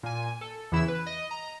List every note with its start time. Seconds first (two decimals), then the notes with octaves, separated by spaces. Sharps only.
0.03 A#2 G#5
0.41 A4
0.72 E2 C#3 E3 E4 E6 E7
0.88 B4
1.06 D#5
1.31 A#5